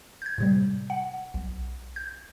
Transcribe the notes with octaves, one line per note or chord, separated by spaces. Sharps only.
G6 G#6
A2 C3 G3
F#5
B1
G6